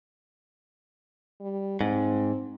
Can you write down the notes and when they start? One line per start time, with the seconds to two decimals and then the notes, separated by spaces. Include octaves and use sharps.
1.40 G3
1.81 G#2 C4